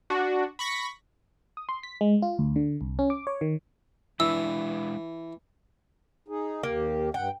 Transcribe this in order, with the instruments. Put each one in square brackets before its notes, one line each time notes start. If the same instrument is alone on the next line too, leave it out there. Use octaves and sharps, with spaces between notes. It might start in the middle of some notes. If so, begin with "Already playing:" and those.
[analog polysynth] D4 F#4
B5 C#6 A#6 B6
[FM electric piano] D#6
C6
B6
G#3
F4
D2
D3
C2
C#4
D6
C#5
D#3
[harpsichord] E3 [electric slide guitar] G#3 D4 B4 [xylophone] E6
[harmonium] D#4 G#4
[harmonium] D#2 G4 [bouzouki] A#3
[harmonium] G2 F#5 [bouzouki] G5